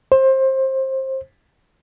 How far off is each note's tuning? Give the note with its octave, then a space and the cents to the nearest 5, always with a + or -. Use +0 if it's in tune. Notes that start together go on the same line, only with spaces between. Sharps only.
C5 +25